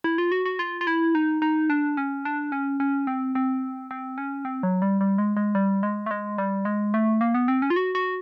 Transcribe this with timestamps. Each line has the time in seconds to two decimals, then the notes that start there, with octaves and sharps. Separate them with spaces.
0.04 E4
0.18 F4
0.32 F#4
0.46 F#4
0.59 F4
0.81 F4
0.87 E4
1.15 D#4
1.42 D#4
1.70 D4
1.97 C#4
2.25 D4
2.52 C#4
2.80 C#4
3.07 C4
3.35 C4
3.91 C4
4.18 C#4
4.45 C4
4.63 F#3
4.82 G3
5.01 G3
5.18 G#3
5.37 G#3
5.55 G3
5.83 G#3
6.06 A3
6.11 G#3
6.38 G3
6.65 G#3
6.94 A3
7.21 A#3
7.34 B3
7.48 C4
7.62 C#4
7.70 F4
7.76 F#4
7.95 F#4